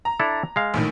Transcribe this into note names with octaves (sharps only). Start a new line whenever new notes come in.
A#5
D4 E4 A4
G#3 F5
A#1 A2 D#3